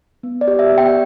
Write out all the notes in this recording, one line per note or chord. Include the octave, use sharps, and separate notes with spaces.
B3
D5
G4
E5
B3
G5